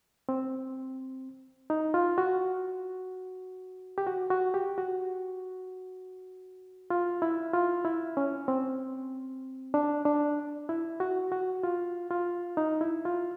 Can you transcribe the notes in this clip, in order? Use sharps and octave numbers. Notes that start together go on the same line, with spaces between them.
C4
D#4
F4
F#4
G4
F#4
F#4
G4
F#4
F4
E4
F4
E4
C#4
C4
D4
D4
E4
F#4
F#4
F4
F4
D#4
E4
F4